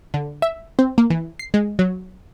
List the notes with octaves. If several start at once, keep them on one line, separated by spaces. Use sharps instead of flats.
D3
E5
C4
A#3
E3
C7
G#3
F#3